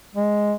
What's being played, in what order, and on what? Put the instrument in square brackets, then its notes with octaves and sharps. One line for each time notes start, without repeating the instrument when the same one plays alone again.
[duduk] G#3